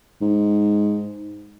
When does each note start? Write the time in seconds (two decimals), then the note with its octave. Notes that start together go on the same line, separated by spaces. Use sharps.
0.21 G#2